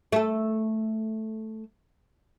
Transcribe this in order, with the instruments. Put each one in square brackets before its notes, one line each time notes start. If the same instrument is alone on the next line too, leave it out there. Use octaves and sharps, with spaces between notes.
[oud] A3 A4